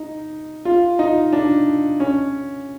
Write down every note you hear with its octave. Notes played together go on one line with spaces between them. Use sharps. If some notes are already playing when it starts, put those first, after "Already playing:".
Already playing: D#4
F4
D#4
D4
C#4